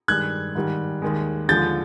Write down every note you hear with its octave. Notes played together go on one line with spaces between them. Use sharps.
G2 D#3 G#3 F#6 G#6
G#2 D#3 G3
D#2 D#3 G#3
D#2 D3 F3 G#3 G6 A6